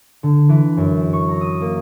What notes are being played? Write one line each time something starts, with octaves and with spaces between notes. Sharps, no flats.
D3
E3
F#2
C#6
A#5
D#6
A#3